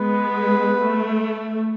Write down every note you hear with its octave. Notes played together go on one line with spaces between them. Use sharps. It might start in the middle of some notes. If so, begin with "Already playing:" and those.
Already playing: G#3 B3 B4
A3